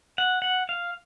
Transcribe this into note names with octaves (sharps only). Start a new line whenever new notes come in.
F#5
F#5
F5